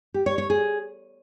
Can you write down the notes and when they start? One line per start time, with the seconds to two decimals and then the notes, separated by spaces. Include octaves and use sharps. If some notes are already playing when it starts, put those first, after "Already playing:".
0.14 G4
0.26 C#5
0.38 C#5
0.50 G#4